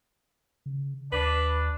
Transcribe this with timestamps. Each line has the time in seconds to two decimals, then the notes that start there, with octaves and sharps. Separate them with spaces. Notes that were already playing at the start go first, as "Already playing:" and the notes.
0.66 C#3
1.12 D#2 D4 B4